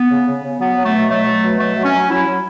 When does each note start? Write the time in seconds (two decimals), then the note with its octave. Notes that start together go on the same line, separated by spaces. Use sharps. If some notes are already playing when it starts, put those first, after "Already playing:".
Already playing: B3
0.10 C#3
0.26 C#3
0.43 C#3
0.59 F#3 B3
0.76 F#3
0.85 A3
0.93 B2
1.09 F#3 A3
1.26 F#3
1.43 B2
1.59 F#3 A3
1.76 F#3
1.85 C#4
1.93 F#3
2.09 F#3 E4
2.27 F#3